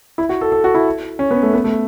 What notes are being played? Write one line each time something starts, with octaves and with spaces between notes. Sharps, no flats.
E4
F#4
A4
A4
F#4
E4
C#4
B3
A3
B3
A3